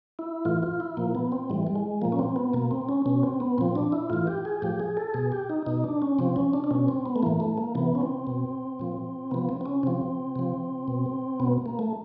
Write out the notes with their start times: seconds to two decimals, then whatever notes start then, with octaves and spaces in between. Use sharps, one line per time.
0.19 E4
0.45 A2 E3 F4
0.63 F4
0.80 E4
0.97 A#2 F3 A#3
1.15 B3
1.32 C4
1.50 A2 E3 G3
1.67 G3
1.76 G#3
2.01 A#2 F3 A#3
2.12 C#4
2.19 C4
2.36 B3
2.53 B2 A#3
2.71 C4
2.89 C#4
3.06 B2 C#4
3.23 C4
3.40 B3
3.58 A#2 F3 C4
3.75 D4
3.92 E4
4.10 A2 E3 F4
4.27 G4
4.45 G#4
4.62 A2 F3 G4
4.80 G#4
4.97 A4
5.14 B2 G#4
5.32 G4
5.49 D#4
5.66 B2 D#4
5.84 D4
6.02 C#4
6.19 C3 F3 C4
6.36 C#4
6.53 D4
6.64 D4
6.71 B2 C#4
6.88 C4
7.06 B3
7.16 A3
7.23 A2 E3 A#3
7.40 A3
7.58 A#3
7.75 C3 E3 B3
7.95 C#4
8.01 C4
8.27 B2
8.79 A#2 F3
9.31 C3 F3 B3
9.49 C4
9.61 C4
9.66 C#4
9.83 C3 F3 C4
10.36 C3 F3
10.88 B2
11.40 B2 B3
11.66 A#3
11.79 A3